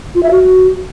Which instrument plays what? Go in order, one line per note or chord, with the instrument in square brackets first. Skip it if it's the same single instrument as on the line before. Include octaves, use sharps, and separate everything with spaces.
[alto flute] F4
E5
F#4